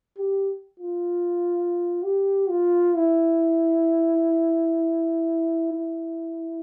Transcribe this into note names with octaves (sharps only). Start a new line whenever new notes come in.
G4
F4
G4
F4
E4
E4